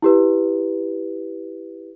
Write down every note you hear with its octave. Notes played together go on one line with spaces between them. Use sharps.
E4 G4 B4